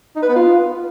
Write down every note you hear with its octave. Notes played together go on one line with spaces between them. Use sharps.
D#4
B4
B3
F4